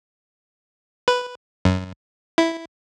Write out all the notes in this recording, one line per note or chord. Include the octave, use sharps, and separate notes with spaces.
B4
F#2
E4